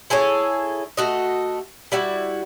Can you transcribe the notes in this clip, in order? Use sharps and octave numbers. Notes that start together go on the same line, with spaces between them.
E4 G#4 A4 C#5
A3 F#4 D#5
G3 E4 F#4